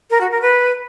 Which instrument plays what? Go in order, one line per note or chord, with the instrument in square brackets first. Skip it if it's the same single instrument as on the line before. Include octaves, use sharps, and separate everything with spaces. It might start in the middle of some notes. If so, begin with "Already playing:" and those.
[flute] A#4
F#4
A#4
B4